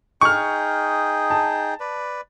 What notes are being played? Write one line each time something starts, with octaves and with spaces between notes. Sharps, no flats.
D#4 G#4 G5 C#6 F6
A5
B4 D5